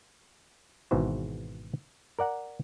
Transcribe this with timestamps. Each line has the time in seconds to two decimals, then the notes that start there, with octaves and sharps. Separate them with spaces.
0.91 G#1 G#2 B2 E3 C5
2.19 A#4 D5 F#5 A#5